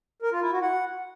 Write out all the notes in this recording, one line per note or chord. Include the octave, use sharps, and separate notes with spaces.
A#4
F4
E4
F#4
F#5